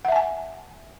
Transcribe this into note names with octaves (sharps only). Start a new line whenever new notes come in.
E5 F#5 G#5 A5